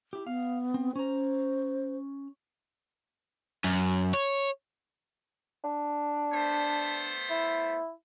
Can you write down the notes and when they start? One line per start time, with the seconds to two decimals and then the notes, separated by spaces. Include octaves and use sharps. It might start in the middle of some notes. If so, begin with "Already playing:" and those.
0.13 E4 G4
0.27 B3 F5
0.74 C4
0.96 C#4 C5 A#5
3.64 F#2
4.14 C#5
5.64 D4
6.34 A3 B3 C5
7.30 E4